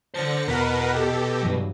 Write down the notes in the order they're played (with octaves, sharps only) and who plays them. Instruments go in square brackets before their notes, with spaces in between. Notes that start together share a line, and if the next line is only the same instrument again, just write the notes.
[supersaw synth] D3 A#6 C#7 [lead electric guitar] C5 A5
[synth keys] E2 B6 [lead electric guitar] B2 [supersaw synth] A#4 B4 F#5
[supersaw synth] G4 A4
[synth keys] G2 E3 F#3